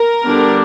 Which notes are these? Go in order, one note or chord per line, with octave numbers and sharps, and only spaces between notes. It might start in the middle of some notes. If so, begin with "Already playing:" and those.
Already playing: A#4
D3 G3 B3 D4